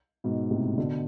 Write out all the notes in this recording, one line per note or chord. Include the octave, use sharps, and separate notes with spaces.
G#2 B2
A2 C3
B2 D3